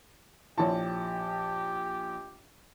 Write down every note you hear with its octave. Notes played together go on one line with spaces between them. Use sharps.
A#1 E4 F4 G4 C#5 A5